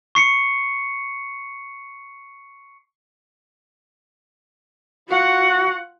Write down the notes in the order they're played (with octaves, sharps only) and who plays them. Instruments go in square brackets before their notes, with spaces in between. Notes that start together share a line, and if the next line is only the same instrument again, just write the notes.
[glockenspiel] C#6 C7 C#7
[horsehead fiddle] F4 F#5 [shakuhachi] F#4